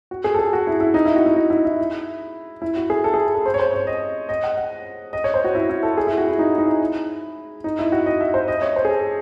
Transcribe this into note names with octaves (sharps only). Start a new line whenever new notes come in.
F#4
G#4
A4
G#4
F#4
E4
E4
D#4
E4
F#4
E4
D#4
E4
E4
E4
F#4
G#4
A4
G#4
A4
C5
C#5
C5
C#5
D#5
D#5
F#5
F#5
D#5
C#5
C5
F#4
E4
E4
A4
G#4
E4
F#4
E4
D#4
D#4
E4
D#4
E4
F#4
D#5
E5
C5
D#5
C#5
C5
G#4
A4